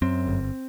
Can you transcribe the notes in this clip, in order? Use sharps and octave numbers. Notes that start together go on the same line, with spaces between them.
F#2 C4
G1